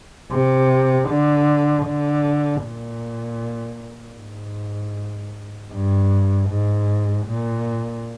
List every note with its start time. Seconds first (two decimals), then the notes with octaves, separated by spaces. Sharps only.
0.32 C3
1.09 D3
1.86 D3
2.64 A#2
4.18 G#2
5.72 G2
6.50 G#2
7.27 A#2